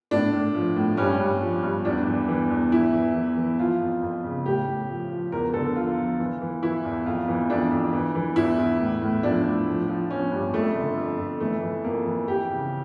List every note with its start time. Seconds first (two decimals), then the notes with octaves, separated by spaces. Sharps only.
0.11 A2 D4
0.33 A2
0.55 F3
0.76 A2
0.97 G2 C#4
1.20 G2
1.41 F3
1.63 G2
1.85 E2 D4
2.07 E3
2.28 E3
2.50 E2
2.71 E3 E4
2.93 E3
3.16 E3
3.37 E3
3.59 F3 F4
3.80 F2
4.03 F2
4.24 C#3
4.45 A2 G4
4.67 A2
4.89 F3
5.11 F3
5.32 E2 A#4
5.54 D3 A4
5.75 F3 F4
5.98 F3
6.19 E3
6.42 E3
6.63 E3 E4
6.85 E2
7.06 F2 F4
7.28 E3
7.50 F2 D4
7.71 F2
7.93 E3
8.15 E3
8.36 E2 E4
8.58 E2
8.80 A2
9.02 A2
9.23 F3 D4
9.46 A2
9.68 F3
9.88 F3
10.10 F3 C#4
10.32 G2
10.54 F2 A3
10.76 D3
10.97 F2
11.18 F2
11.40 E3 A3
11.62 E3
11.84 F2 A#3
12.06 E3
12.27 F2 G4
12.50 C#3